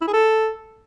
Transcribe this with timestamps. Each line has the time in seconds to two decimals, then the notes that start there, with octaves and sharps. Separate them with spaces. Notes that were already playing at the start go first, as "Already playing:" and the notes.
0.01 E4
0.07 G#4
0.13 A4